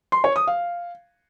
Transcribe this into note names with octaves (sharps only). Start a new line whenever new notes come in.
C6
C#5
D#6
F5